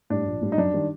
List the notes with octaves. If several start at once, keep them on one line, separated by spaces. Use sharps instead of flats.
A2 G3 D4
A#1
A2 G3
D#4
F#2 D4
D#3 G3